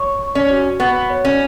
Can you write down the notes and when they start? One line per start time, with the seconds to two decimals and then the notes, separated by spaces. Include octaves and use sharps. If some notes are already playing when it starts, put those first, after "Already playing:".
Already playing: C#5 C#6
0.21 C#6
0.35 C#4
0.50 F#4
0.80 B3 C#6
1.10 C#5
1.25 C#4